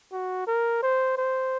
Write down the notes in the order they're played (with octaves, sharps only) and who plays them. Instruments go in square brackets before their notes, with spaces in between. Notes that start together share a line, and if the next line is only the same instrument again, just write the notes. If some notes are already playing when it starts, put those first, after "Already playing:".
[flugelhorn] F#4
A#4
C5
C5